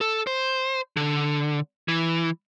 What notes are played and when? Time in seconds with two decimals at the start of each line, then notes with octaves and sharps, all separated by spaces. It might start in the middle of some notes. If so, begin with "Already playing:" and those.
0.01 A4
0.27 C5
0.97 D3
1.88 E3